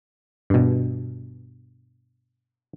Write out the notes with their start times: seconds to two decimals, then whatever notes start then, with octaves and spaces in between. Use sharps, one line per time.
0.50 G2 B2